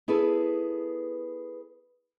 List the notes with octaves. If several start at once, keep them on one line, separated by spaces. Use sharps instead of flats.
B3 E4 G#4 A4 B4